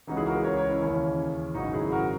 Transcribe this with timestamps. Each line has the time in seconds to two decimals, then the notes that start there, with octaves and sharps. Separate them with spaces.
0.07 C#2 C#3 E3 D#4 F#4
0.17 E4 G#4
0.26 F#4 A#4
0.35 G#4 B4
0.44 A#4 C#5
0.57 A#4 C#5
0.69 C#4 E4
0.82 D#2 C#3 E3
1.55 G#1 F#2 C#3 D#4 F#4
1.73 E4 G#4
1.92 F#4 A#4